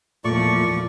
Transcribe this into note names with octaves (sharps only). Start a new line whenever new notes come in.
E2 A#2 F3 A3 F4 D5 C#6